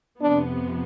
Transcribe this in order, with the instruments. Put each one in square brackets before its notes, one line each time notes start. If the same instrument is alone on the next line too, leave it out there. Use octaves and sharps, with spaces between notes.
[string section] F2 C3 F3 B3 [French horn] D4